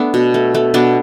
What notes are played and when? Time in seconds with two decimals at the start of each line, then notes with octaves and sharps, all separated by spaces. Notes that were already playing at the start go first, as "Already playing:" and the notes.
Already playing: A3 B3 D4
0.14 B2
0.34 A3
0.55 A3
0.74 B2 B3 D4